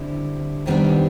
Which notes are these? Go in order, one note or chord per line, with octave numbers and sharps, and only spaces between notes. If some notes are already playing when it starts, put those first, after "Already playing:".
Already playing: D3 G3 C4 E4
C3 D#3 G3 B3 D4